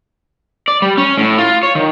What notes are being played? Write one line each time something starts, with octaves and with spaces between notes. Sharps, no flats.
D5
G3
C#4
A2
F4
C#5
D#3